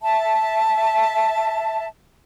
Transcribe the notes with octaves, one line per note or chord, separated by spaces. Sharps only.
E5 A5